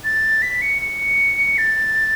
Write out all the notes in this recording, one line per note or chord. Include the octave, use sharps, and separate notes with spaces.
A6
B6
C#7
C#7
A6